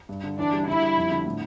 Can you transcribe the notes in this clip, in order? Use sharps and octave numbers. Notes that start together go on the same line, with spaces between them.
G2
D3
E3 D4
G3
D3 E4
G3
F2
D3
A2